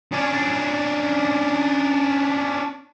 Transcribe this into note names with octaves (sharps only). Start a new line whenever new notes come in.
C#4 D4